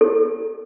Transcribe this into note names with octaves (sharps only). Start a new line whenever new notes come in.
A4